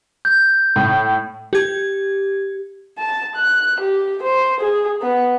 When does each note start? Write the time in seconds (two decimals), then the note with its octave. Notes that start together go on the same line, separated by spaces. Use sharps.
0.25 G6
0.76 A2
1.53 G4 G#6
2.98 A5
3.36 F#6
3.81 G4
4.23 C5
4.60 G#4
5.02 B3